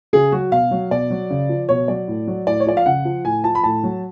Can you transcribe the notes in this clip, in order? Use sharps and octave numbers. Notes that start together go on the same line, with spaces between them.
C#3 G#4
F#3 F#4
B2 F5
F#3
B2 D5
F#3
C#3
F3
B2 C#5
F#3 D5
A2
F#3
A2 D5
C#5
F3 D5
F5
C#3 F#5
F3
A2 G#5
F3 A5
B5
A2 A5
F#3